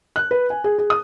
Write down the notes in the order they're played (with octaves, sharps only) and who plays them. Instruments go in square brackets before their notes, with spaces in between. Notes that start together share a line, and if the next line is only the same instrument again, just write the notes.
[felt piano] F#6
B4
G#5
G#4
G#4
D#6